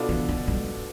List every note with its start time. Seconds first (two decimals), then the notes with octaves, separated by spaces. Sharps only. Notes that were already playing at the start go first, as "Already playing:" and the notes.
Already playing: B2 B3 D4 F4 A4
0.09 E3
0.29 D3
0.47 G2